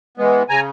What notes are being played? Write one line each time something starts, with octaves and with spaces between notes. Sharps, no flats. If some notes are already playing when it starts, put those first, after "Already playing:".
E3 G#3 B3
C#3 G#5 A#5